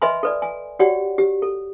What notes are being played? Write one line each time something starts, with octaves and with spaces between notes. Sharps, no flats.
B4 D#5 E5 G#5 B5 C6
A4 B4 D5
G#5
F#4 G4 C#5 D5 F#5 G5
G4
A4